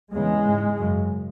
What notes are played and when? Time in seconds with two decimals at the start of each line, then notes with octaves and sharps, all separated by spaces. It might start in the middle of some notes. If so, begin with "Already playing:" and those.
0.13 E2 C#3 G#3
0.46 G#2
0.78 F#2 C#3